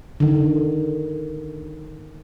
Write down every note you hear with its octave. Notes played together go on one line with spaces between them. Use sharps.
D3 D#3